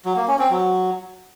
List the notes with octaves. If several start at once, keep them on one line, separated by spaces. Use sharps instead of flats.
F#3
A#3
C#4
C4
F#3